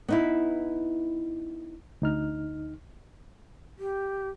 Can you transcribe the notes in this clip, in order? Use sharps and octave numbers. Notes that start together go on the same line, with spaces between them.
B3 D#4 E4
D2 D#4 F6
G4